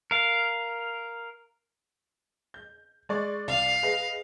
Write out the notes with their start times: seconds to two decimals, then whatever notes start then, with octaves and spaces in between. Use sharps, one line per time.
0.11 A#4 F5
2.54 G6
3.09 G#3 D5 C#6
3.48 C2 D5 F5
3.83 G#4 B4 D#5